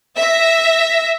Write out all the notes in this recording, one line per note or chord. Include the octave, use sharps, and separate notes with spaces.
E5 A#6